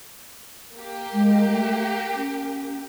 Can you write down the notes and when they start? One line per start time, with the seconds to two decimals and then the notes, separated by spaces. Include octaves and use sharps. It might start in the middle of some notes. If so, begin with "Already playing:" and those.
0.75 A#3 G4
1.13 G#3
1.49 A3
2.15 C#4